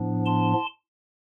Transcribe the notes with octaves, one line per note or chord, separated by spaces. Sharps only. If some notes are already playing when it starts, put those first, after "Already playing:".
Already playing: A2 F3 B3 D4
A5 C6